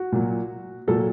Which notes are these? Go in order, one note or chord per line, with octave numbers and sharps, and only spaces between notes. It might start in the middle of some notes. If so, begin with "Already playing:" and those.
Already playing: F#4
A#2 F#3
A#2 F#3 A4